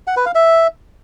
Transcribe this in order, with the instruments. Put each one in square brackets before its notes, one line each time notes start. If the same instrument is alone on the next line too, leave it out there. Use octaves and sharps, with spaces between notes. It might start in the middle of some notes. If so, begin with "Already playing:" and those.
[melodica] F#5
B4
F5
E5